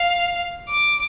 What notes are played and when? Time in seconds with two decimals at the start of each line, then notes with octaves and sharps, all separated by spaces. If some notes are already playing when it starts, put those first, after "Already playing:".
Already playing: F5
0.69 D6